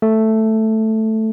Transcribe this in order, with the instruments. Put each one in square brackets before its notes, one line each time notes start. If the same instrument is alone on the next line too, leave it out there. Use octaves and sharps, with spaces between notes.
[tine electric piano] A3